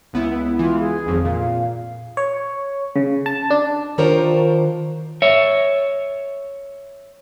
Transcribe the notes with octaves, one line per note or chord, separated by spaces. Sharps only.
C#2 B3 E4
E3 G#3 F4
G#4
G#1 F2
A#2 F5
C#5
C#3
A5
D4
D#3 D4 F4 A#4 C5 C#5
C#5 E5